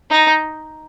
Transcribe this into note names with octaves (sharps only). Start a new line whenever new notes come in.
D#4